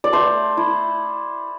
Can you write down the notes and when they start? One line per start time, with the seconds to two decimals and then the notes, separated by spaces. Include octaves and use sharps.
0.04 D5
0.12 A3 C5
0.57 E4